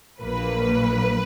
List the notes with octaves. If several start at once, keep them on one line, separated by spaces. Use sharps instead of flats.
A#1 A#2 F#3 A#3 B4